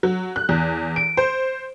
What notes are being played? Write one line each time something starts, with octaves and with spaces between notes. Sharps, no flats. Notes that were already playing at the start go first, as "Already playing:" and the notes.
F#3
F#6
E2
D7
C5